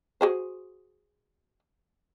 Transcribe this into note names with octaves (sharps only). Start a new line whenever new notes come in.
F#4 G#4 C5